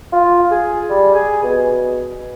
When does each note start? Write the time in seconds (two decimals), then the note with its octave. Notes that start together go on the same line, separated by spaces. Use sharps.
0.12 F4
0.51 G#4
0.90 G3
1.14 G#4
1.43 B2